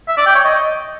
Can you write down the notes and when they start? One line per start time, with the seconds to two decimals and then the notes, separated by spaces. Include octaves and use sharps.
0.08 E5
0.17 D5
0.26 G5
0.35 C#5
0.44 D#5